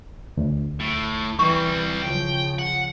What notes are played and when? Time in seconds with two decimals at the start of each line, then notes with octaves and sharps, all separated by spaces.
0.37 D2
0.80 A2
1.39 E3 G3 C4 C#6
2.03 C#3 F3 G5
2.59 F#5